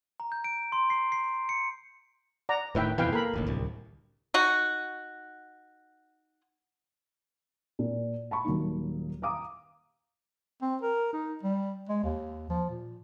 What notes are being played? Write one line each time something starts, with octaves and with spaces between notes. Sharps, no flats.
A#5
G6
D7
C6
C7
C7
C#7
D5 F#5 A#5
D#1 A2 D#3 B4 E5 G5
F2 B2 E3 B4 F5 G5
A#3 A4 A#4 B5
E1 A1 D#2
D1 C2
D#4 F#4
A#2
A5 B5 C#6
D#1 F#3 A#3 D#4
F5 A#5 D6 D#6
C4
A#4
D#4
G3
G#3
D#2
F3
A#2